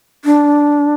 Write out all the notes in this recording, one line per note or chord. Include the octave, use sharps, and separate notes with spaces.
D4